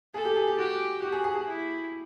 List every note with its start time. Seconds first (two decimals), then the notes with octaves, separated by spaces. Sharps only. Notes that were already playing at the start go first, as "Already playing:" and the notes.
0.14 G#4 A4
0.25 G4
0.36 G#4
0.47 G4
0.58 F#4 G4
1.02 F#4 G4
1.12 G#4
1.24 G#4
1.35 G#4
1.46 E4